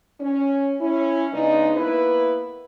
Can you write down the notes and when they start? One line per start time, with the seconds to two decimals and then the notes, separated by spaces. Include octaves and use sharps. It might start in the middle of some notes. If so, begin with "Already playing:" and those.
0.21 C#4
0.80 C#4 E4
1.32 C#3 G#3 B3 D4 D#4
1.76 A#3 B3 E4 B4